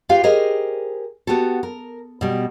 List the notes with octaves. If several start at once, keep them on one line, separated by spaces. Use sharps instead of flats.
F4 G4 B4 F5
G4 G#4 A#4 C5 D#5
B3 F#4 G4 A4
A#4
B2 G3